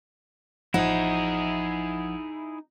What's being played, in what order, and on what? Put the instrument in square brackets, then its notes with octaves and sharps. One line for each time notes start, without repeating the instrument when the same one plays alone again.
[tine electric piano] A1 F3 F#5 [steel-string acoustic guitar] D#4 [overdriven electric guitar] E4 G#4